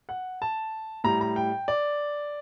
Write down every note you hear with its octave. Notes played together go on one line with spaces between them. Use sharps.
F#5
A5
A2 G3 A#5
A#5
G5
D5